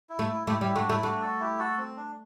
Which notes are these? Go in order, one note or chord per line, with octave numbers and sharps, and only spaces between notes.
E4
A3
E4
A3 E4 G4
G3 E4 G4
A3 D4 F#4
A3 E4
A3 D4 F#4
F#4 A4
E4 G4
F#4 A4
C4
D4